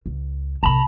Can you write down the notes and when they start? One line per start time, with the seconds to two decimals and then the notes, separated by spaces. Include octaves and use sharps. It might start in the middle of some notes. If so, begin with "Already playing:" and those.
0.06 C#2
0.63 C2 A2 A5 B5